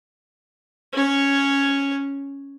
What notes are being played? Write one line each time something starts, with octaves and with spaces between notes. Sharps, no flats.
C#4 C#5